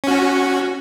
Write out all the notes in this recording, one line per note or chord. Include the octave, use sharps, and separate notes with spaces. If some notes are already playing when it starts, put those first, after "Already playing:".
C#4 F#4